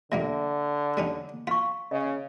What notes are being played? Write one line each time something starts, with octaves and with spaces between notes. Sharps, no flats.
A#2 D3 G3 A#3 E5
G3 C#4 D#4
F4 F5 C#6
C#3 D#5